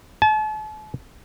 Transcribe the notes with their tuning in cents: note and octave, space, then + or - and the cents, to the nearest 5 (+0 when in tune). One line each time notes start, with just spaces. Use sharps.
A5 -40